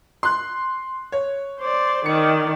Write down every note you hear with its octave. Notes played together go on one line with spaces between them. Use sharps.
C6 F#6
C#5
C5 D5
D#3 D5 C#7